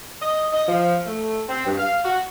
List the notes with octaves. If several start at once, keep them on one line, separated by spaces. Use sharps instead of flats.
D#5
D#5
F3
A3
C4
G2
F5
F#4